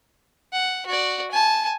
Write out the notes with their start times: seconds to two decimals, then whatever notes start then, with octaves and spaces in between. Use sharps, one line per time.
0.53 F#5
0.87 F#4 D5
1.31 G#5 A5